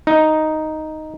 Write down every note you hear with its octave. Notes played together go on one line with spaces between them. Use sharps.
D#4